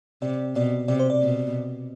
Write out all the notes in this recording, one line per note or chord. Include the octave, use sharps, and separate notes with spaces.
C3 D5
B2 D5
C3 D5
C5
D5
B2